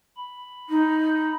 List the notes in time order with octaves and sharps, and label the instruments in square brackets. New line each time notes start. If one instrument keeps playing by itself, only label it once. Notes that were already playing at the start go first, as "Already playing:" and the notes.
[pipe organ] B5
[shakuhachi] D#4